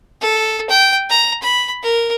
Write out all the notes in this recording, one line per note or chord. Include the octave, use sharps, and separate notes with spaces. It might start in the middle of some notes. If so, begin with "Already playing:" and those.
A4
G5
A#5
B5
A#4